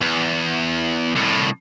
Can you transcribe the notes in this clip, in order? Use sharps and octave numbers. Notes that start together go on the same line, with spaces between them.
E2
C2 A2